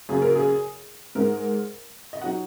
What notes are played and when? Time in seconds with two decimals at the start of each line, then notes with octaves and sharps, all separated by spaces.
0.09 F#2 C#3 A#3 G#4
0.22 A#4
0.35 G#4
1.15 G#2 G#3 D#4 A#4
2.13 D#5
2.22 F#3 D#4 F#5